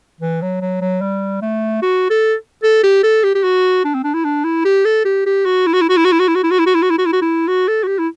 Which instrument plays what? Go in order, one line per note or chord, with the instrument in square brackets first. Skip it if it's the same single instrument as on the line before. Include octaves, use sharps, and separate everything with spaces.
[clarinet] E3
F#3
F#3
F#3
G3
A3
F#4
A4
A4
G4
A4
G4
G4
F#4
D4
C4
D4
E4
D4
E4
G4
A4
G4
G4
F#4
E4
F#4
E4
F#4
E4
F#4
E4
F#4
E4
F#4
E4
F#4
E4
F#4
E4
F#4
E4
F#4
E4
F#4
E4
F#4
A4
F#4
G4
E4